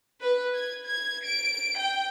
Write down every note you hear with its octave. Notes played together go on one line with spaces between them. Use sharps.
B4
G#6
G#6
D7
G5